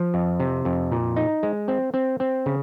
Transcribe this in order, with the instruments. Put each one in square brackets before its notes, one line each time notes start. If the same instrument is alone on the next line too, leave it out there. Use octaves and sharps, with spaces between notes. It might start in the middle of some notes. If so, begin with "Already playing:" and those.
Already playing: [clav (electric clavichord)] F3
F2
C3
F2
A#2
D#4
G#3
C4
C4
C4
C#3